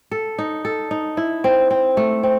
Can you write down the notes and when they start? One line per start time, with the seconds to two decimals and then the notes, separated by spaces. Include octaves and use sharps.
0.11 A4
0.38 D#4
0.65 A4
0.91 D#4
1.17 E4
1.44 C4
1.71 C4
1.97 A3
2.23 C4